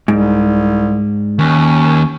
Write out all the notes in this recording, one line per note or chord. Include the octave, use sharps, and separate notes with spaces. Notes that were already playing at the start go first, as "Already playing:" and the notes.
C2 G#2
D#2 C#4